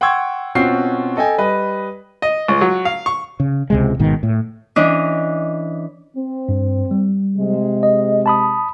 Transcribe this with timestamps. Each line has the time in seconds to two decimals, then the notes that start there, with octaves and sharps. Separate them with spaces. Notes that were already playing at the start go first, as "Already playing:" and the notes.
0.01 F#5 G5 C6 C#6 E6 G#6
0.55 B2 C4 C#4 F4 F#4 C7
1.17 A4 D#5 G5 G#5
1.38 G3 B4 D#5
2.22 D#5
2.48 C#2
2.61 F#3
2.85 F5
3.06 C#6
3.40 C#3
3.70 C#2 C3 G#3
3.99 G#1 G#2 B2 D#3
4.23 A2
4.76 E3 C#4 D4 D#5
6.16 C4
6.49 G2
6.91 G3
7.37 C3 G#3
7.83 D#5
8.26 A5 B5 D#6